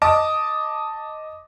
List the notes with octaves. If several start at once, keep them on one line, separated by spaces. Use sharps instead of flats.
D#5 A5 D6 D#6